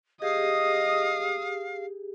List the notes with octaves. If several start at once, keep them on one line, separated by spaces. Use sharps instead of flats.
G4 G#4 D#5 F5 D#6